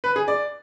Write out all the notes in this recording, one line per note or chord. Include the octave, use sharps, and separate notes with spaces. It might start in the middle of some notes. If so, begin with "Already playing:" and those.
B4
G#4
D5